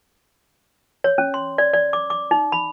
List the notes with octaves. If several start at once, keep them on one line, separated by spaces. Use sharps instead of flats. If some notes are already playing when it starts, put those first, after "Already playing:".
C#5
C#4
C6
D5
D5
D6
D6
D#4
B5